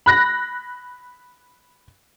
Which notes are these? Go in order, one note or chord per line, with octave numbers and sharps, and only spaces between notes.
B5 F#6 A#6